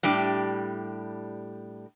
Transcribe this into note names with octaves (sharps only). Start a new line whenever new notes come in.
A2 G3 D4 G4